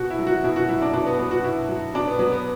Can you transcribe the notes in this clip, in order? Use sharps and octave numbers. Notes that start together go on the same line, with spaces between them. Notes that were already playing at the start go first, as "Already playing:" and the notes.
Already playing: B2 F#4
E4
F#3
F#4
B2 E4
F#4
F#3 E4
D4
B2 D4
B3
F#3 B3
F#4
B2 E4
F#3
B2 D4
B3
F#3 B3
B3